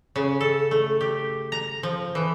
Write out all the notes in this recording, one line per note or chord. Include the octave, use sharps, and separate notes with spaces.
C#3
A4
A3
G4
A#5
F3
E3